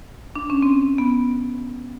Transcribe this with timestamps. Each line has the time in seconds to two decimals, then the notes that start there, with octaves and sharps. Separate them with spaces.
0.36 D4
0.50 C#4
0.62 C4
0.98 B3